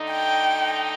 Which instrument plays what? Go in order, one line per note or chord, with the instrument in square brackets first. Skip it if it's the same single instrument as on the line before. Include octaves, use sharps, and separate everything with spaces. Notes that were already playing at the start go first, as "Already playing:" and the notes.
Already playing: [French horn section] D3 A3 D#4
[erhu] G5